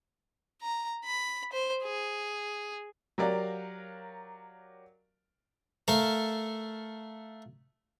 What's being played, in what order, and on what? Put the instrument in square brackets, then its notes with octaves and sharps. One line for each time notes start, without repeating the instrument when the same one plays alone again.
[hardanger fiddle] A#5
B5
C5
G#4
[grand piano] F#3 G4 A#4 D5 F5
[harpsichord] A3 A4 A#4 F5